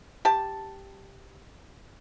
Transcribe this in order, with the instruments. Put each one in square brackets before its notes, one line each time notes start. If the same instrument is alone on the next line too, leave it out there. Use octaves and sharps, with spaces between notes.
[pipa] G4 A5